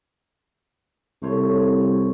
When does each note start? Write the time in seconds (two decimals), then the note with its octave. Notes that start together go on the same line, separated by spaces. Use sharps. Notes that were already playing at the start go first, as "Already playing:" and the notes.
1.23 C2 A3 C5 C#5